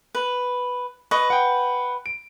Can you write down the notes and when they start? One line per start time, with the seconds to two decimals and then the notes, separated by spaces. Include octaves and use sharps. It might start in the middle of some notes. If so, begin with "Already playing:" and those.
0.15 B4
1.11 B4 D#5 C#6
1.30 F#5 G5
2.06 D7